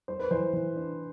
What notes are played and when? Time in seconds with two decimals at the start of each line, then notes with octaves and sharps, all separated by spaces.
0.08 G3 C5
0.19 B4
0.31 E3 C5
0.53 E3
0.76 D4